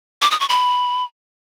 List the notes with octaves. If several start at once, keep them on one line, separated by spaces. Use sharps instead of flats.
D6
D#6
C#6
B5